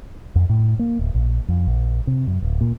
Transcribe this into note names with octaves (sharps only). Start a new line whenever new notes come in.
F2
A2
A#3
D1
A#1
F2
A#1
C3
F#2
D1
A#2